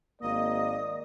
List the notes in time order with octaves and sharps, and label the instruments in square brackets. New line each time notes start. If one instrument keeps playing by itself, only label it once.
[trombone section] G#1 A#3 [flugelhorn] D5 [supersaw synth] D#5 [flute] D#6